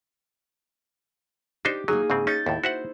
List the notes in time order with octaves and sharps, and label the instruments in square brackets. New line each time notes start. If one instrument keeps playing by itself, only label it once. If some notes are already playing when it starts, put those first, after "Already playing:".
[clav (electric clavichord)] D4 D#4 C5 [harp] G4
[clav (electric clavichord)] F#3 [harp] A#3 D#4 G#4
[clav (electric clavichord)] G#2 C#3 C4
[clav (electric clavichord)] C#4 D#4 [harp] G6 A6
[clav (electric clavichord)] D#2 A2 [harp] E4
[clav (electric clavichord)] F#4 E5 F#5 [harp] C5